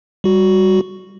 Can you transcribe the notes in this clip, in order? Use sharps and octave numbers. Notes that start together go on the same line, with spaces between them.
G3 F#4